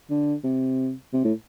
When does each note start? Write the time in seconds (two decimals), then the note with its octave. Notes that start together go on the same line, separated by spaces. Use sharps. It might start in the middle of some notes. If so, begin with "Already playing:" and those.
0.10 D3
0.44 C3
1.13 C3
1.25 A2